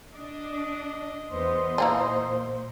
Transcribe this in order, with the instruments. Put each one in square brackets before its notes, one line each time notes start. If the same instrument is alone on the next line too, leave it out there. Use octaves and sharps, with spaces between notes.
[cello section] D4 [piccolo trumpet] D#5
[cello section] E2 B3 [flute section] C5 C6
[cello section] A#2 [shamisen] E3 A#3 D#4